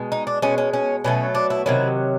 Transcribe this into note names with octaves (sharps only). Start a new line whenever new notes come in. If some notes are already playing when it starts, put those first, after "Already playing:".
Already playing: B2 G#3
D#4
D4
B2 G#3 C#4
C#4
C#4
B2 F#3 A3 C#4
D4
E4
C3 D#3 F#3 E4